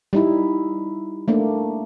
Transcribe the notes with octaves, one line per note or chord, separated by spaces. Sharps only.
G3 D#4 E4
A3 A#3 D4